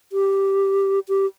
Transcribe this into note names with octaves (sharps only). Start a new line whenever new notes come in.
G4
G4